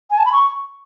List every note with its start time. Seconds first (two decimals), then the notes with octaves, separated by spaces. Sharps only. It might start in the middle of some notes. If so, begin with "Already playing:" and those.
0.11 G#5
0.18 A5
0.25 B5
0.32 C#6